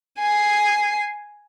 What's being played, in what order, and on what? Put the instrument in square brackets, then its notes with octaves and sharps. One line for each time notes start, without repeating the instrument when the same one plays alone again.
[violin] G#5 C7